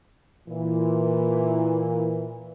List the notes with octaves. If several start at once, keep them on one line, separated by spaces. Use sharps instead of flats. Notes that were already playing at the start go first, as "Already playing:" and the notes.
A#2 E3